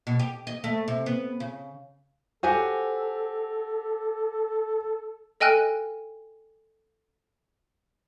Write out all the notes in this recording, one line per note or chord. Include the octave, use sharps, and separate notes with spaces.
B2
G4
D#5
A3
C3
B3
C#3
F#4 G4 A4 C5 F#5 G#5
A4 D#5 G5 G#5 F6 F#6